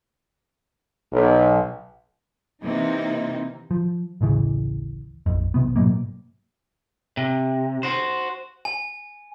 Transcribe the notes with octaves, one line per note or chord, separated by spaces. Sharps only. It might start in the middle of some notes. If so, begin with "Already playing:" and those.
B1
C3 E3 A#3 D#4
F3
D1 A1 C#3 E3
A#1 F2
B1 C3 B3
G#2 B2 F#3 A#3
C3
F#4 C5
G#5